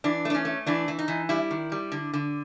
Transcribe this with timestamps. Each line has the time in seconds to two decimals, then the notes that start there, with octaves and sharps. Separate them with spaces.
0.04 E3 D4
0.25 A3 D4
0.35 C#4
0.45 A3
0.66 E3 D4
0.88 E3
0.99 D#4
1.08 E3
1.29 G3 E4
1.51 D#3
1.72 G3
1.92 D3
2.13 D3